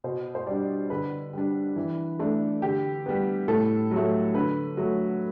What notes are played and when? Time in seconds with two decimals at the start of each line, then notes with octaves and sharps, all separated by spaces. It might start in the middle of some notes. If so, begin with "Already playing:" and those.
0.04 B2 C5
0.35 C5
0.47 G3 D4 D5
0.90 D3 B4
1.33 G3 D4
1.76 E3
2.19 A3 D4
2.62 D3 G4
3.06 G3 B3
3.48 A2 A4
3.91 F#3 A3
4.34 D3 B4
4.77 F#3 A3